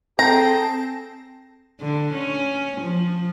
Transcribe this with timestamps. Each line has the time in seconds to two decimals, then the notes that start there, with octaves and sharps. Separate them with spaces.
0.19 C4 G#4 A4 G5 A5 A#5 A#6
1.81 D3
2.14 C#4
2.81 F3